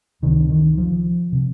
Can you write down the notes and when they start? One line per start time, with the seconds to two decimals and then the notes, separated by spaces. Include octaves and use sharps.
0.22 C#2 C3 D#3
0.49 D#3
0.78 F3
1.32 C3